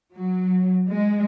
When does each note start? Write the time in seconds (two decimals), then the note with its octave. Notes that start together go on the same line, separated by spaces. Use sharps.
0.15 F#3
0.89 G#3